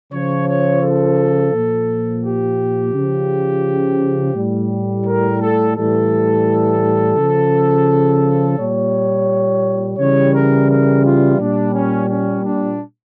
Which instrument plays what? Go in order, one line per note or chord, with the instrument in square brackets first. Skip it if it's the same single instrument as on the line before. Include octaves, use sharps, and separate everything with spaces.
[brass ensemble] C#3 F3 C#5
C#5
A4
A#2 F3
G4
C#3 F3
A2 G3
A#4
A4
A2 E3 G3 A4
C#3 F3
A#2 G3 C#5
C#3 E3 G3 C#5
A#4
A#4
F4
A#2 G3 D4
C#4
C#4
D4